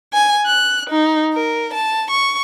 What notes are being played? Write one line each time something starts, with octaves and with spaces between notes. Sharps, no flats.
G#5
F#6
D#4
A#4
A5
C#6